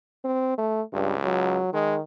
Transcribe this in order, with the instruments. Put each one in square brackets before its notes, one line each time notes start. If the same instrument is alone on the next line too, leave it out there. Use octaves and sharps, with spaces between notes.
[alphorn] C4
A3
[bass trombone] C#2 [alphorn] G2
[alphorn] F#3
[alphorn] D#3 [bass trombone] G#3